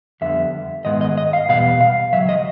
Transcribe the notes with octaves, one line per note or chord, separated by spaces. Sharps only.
F2 D3 G3 B3 E5
G#2 D#3 G#3 B3 D#5
D#5
D#5
F5
E2 B2 G3 B3 F5
F5
C#2 B2 F#3 E5
D#5